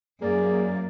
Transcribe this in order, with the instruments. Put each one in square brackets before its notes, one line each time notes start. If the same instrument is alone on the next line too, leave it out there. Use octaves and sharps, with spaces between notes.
[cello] F#2 [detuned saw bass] A#3 [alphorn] G#4 [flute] D5